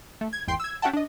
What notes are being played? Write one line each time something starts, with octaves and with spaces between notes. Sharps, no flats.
A3
G#6
G#1 E2 G5 C6 C7
E6 G#6
C#4 F#4 E5 F#5 G5 A5
D4 D#5